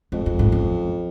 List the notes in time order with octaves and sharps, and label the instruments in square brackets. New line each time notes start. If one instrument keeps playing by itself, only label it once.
[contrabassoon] F2 [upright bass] G#2
[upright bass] F#2
G#2
F#2